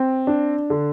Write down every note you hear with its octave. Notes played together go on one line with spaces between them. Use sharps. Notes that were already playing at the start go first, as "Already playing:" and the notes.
Already playing: C4
D4
D3